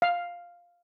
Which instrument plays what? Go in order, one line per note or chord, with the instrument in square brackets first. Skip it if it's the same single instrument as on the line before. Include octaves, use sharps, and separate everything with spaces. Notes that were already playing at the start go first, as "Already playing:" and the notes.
[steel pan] F5